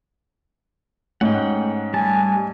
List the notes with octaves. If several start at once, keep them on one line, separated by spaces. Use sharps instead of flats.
G#2 A3 C#4 F#5 G5
G3 G#5 A5